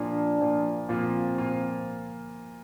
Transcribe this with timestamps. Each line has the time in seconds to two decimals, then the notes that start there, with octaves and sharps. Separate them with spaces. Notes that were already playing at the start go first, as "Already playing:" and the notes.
Already playing: A#2 F3 A#3 D4 F4
0.40 A#2 F3 A#3 F4
0.89 A#2 F3 A#3 C4 F4
1.38 A#2 F3 A#3 F4